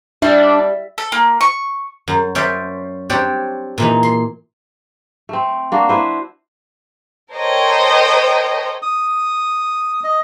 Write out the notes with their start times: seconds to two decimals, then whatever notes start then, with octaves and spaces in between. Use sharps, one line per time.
0.22 G3 D4 E5
0.98 A4
1.12 A#3
1.41 C#6
2.08 F#2
2.35 C#4 B4 C5 D5 E5
3.10 C4 D4 G4 C#5 D5
3.78 A#2 E3 D#4
4.03 C6
5.29 A3 C4
5.72 A#3 D4 F#4
5.89 E4 B4 C5
7.33 A4 A#4 C5 C#5 D#5 G5
8.82 D#6
10.04 D#5